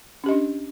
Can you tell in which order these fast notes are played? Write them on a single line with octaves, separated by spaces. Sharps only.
C#4 G4 D#5 D4